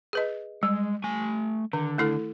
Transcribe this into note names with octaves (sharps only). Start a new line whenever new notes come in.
G#4 B4 D#5
G3 G#3
A3 G#5
D3 D#3
A3 E4 A4